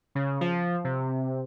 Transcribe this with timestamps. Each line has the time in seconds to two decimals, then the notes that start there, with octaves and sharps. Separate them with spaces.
0.15 C#3
0.41 F3
0.84 C3